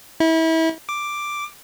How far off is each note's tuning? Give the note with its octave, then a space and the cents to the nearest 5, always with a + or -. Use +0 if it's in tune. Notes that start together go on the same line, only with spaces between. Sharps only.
E4 -30
D6 +5